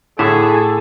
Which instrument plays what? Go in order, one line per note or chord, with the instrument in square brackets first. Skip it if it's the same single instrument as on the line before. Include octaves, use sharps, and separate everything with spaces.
[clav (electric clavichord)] A2 D3 [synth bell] E4 [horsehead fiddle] G#4 G#5 [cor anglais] A4